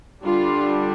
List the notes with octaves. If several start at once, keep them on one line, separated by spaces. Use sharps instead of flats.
D3 G3 D4 F4